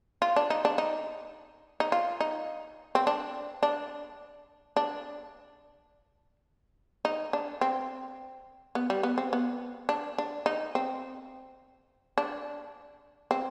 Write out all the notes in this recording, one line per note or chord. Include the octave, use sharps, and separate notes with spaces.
F4
D4
D#4
D4
D#4
D#4
F4
D#4
C4
D4
D4
D4
D#4
D4
C4
B3
G3
B3
C4
B3
D4
D4
D#4
C4
D4
C4